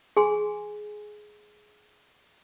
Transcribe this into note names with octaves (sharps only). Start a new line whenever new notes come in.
G#4 G#5 C6